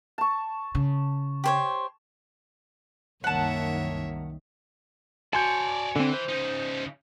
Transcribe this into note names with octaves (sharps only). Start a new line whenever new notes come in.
A5 C#6
C#3
G4 C5 C#5
C2 F#2 D#3 A#3 C#5 E5 F#5 A5
F#4 C#5 D5 G#5 A5 C6 G6
D3 E3 C4
C5
C#3 D#4 G6